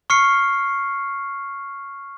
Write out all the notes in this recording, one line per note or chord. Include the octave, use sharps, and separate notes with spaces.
C#6 F6 C7 C#7